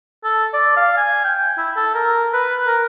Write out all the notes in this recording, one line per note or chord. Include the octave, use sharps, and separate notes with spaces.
A4
D5
F5
G#5
G5
E4
A4
A#4
B4
A#4